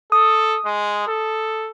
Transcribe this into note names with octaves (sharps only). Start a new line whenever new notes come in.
A4 D#6
G#3
A4